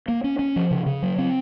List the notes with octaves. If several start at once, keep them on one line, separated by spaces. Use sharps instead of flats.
A#3
C#4
C#4
F3
C#3
C#3
F#3
C4